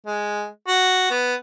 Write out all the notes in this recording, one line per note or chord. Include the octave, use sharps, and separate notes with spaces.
G#3
F#4
B3